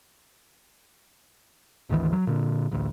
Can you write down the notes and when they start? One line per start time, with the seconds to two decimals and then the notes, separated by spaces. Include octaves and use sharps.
1.89 G#1 D2 D#3 E3
2.13 F#3
2.27 A#2 D3
2.71 A1 D2